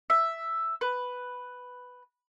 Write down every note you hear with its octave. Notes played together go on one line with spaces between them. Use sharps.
E5
B4